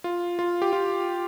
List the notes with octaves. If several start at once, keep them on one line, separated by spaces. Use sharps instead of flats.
F4
F4
G4
F4